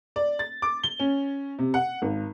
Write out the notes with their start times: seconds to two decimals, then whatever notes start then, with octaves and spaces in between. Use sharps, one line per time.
0.16 D5
0.39 A6
0.62 D6
0.83 G7
0.99 C#4
1.59 C3
1.74 F#5
2.02 G#1